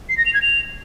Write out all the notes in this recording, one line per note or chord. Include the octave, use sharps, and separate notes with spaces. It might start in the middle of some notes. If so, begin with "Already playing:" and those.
C7
A#6
F7
G#6
F7